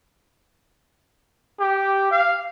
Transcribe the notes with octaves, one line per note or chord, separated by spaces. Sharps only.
G4
F5